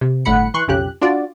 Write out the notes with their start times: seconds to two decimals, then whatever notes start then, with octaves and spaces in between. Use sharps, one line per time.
0.01 C3
0.25 G1 A2 F#5 B5 C#7
0.54 E3 C6 C#6 F#6
0.68 B1 F2 C#3 G4 F#6
1.01 D4 F4 F#4 D5